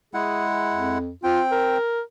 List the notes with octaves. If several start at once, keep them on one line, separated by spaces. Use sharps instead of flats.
G#3 E4 G#4 F#5
F2
C4 F4 G5
A#4